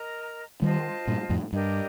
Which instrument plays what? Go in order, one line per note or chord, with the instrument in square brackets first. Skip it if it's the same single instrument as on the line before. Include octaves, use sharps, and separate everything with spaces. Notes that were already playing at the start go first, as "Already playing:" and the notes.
Already playing: [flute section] A#4 D#5 A#5
[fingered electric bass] D#3 G3 [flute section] F4 C5 D#5 A5
[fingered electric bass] G2 A#2
F2 A2
[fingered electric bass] G2 [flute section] D4 G4 A#4 D#5